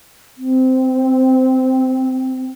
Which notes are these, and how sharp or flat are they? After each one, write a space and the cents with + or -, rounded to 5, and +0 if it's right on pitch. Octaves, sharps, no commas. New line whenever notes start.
C4 -15